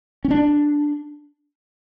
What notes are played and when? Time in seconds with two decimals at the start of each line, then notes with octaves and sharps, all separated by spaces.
0.25 C#4
0.31 D4